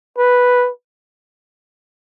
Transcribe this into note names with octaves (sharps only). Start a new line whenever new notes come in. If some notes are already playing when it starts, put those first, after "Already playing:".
B4